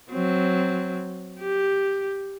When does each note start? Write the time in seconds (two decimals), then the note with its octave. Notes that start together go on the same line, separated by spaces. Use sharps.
0.11 F#3 C4
1.40 G4